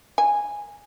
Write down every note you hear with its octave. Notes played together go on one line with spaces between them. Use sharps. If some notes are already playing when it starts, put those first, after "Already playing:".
G#5